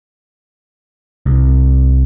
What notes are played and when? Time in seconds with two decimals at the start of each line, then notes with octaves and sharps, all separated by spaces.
1.26 C2